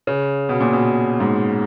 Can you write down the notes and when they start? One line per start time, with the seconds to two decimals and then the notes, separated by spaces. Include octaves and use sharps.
0.07 C#3
0.49 B2
0.61 A#2
0.73 B2
1.20 G#2